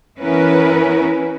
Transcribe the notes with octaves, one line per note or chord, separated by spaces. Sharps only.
E3 B3 C#4 E4 A#4 B4